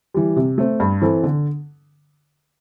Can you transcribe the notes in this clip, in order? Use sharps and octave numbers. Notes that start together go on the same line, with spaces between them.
E3 G3
C3
A3 C4
G2
E3 C4 A4
D3